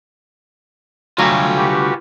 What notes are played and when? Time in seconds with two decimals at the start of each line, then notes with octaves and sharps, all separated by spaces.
1.18 D2 F#3 G3 A3 F4 G#5
1.56 F#4 G4 B4